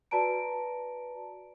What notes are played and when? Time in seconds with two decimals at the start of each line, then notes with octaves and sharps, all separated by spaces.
0.11 F#4 B4 D5 A5 A#5 D7